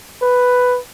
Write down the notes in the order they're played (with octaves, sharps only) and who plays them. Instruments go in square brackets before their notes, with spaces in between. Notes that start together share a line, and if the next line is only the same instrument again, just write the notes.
[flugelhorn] B4